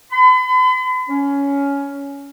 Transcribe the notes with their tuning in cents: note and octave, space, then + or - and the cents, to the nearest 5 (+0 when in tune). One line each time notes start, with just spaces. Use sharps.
B5 +45
C#4 +15